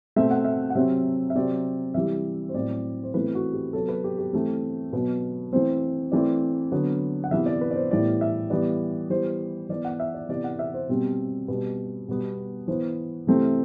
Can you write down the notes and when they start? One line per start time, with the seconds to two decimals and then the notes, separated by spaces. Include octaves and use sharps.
0.16 B2 A3 C4 E5
0.31 F#5
0.45 E5
0.70 F#5
0.75 C3 F#3 C4 E5
1.30 E5
1.35 C3 F#3 C4 D5
1.94 C3 E3 G3 E5
2.49 C5
2.54 A2 F#3 C4 D5
3.03 C5
3.14 E3 A3 C4 B4
3.35 F#4
3.54 G4
3.73 C3 F#3 B3 A4
3.89 B4
4.04 G4
4.18 G4
4.33 E3 A3 C4
4.92 B2 F#3 B3 B4
5.53 E3 A3 C4 C5
6.12 E3 A3 C4 D5
6.72 D3 F#3 B3
7.24 F#5
7.31 C3 E3 B3 E5
7.46 D5
7.61 B4
7.71 D5
7.76 C5
7.91 A2 E3 G3 B3 D5
8.21 E5
8.50 E3 G3 B3 D5
9.10 E3 G3 B3 C5
9.69 E3 B3 D5
9.85 F#5
10.00 E5
10.14 D5
10.29 C3 E3 B3 D5
10.44 F#5
10.59 E5
10.74 C5
10.89 B2 G3 C4
11.48 B2 G3 B3 B4
12.09 B2 G3 B3
12.68 E3 B3 C5
13.27 C3 E3 A3 C4